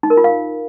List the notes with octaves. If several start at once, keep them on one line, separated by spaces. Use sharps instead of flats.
D#4
A#4
F4
F5